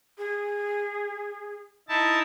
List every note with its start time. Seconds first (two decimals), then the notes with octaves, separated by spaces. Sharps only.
0.18 G#4
1.89 D#4 E4 A5